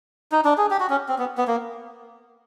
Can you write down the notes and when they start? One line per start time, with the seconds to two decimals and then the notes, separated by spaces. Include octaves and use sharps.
0.32 D#4
0.45 D4
0.58 G#4
0.70 G4
0.80 F#4
0.90 C#4
1.08 C4
1.18 B3
1.38 B3
1.47 A#3